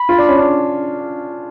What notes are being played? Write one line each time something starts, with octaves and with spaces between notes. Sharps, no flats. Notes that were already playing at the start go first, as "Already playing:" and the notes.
Already playing: B5
F4
D4
C#4
D4